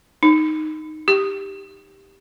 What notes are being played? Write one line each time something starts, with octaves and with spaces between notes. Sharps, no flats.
D#4
G4